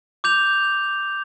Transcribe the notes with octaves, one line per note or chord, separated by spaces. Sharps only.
D6 G6 F7